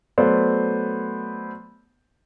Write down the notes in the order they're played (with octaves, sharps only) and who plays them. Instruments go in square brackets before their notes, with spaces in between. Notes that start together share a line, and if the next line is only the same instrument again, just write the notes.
[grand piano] F#3 A3 B3 C5 D5